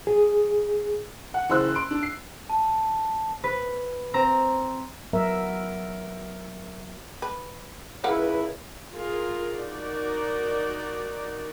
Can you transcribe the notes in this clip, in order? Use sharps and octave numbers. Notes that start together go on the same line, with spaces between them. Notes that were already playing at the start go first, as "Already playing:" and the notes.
G#4
F#5
F#1 E3 C5 E6 F#6
C6 D7
D4
C7
A5
B4
C4 A#5
F#3 B3 A#4 E5
B4
C#2 E4 A#4 B4 F5 F#5
F4 G#4 A#4
D#4 F#4 A#4 D5